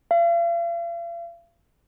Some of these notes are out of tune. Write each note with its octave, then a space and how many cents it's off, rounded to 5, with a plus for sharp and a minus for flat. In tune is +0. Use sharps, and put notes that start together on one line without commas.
F5 -45